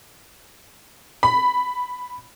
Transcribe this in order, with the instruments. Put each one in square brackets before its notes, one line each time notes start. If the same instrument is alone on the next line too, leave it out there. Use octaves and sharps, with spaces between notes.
[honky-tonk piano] B5